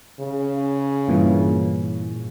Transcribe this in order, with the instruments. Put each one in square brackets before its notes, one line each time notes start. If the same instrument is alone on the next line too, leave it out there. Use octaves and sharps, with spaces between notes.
[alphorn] C#3
[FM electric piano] G2 A#2 E3